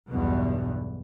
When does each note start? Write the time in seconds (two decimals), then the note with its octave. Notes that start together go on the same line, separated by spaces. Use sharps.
0.11 B1 E2 G2 B2